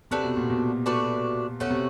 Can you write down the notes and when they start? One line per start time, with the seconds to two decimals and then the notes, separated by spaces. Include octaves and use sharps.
0.11 C3 A3 D4 F#4 B4
0.24 B2
0.37 A#2
0.50 B2
0.86 A3 D4 F#4 B4
1.60 B2 A3 C#4 F#4
1.70 C3